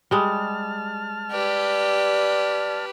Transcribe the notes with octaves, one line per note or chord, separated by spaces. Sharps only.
G3 G#3 A5 F6
G4 B4 D5